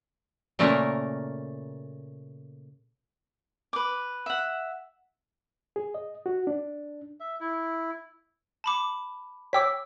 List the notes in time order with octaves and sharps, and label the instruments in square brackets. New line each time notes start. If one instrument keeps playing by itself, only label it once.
[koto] A#2 C#3 A3 A#3 A#4
[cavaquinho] B4 D6
E5 F#5
[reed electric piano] G#4
D#5
F#4
D4
[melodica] E5
E4
[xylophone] A5 B5 D6
[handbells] C#5 G5 D6 [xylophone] E6 B6